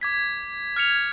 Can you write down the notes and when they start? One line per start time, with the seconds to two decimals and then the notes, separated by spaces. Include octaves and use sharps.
0.01 D6 G#6 B6
0.76 F6 G#6 C#7 F7